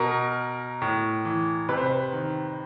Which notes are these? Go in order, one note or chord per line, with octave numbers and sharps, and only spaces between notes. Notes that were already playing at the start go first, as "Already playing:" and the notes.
Already playing: B2 A#4
A2
E3
C3 B4
C5
B4
D#3